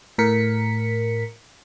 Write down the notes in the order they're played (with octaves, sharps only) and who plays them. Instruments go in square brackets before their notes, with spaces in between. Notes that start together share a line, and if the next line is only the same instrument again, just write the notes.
[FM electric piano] A2 A#4 B6 C#7